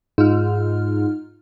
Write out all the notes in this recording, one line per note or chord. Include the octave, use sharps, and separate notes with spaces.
G#2 D#4 F4 F6